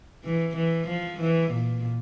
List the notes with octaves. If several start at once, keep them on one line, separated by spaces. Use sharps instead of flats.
E3
E3
F3
E3
A#2